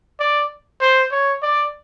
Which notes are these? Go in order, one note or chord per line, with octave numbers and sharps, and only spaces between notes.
D5
C5
C#5
D5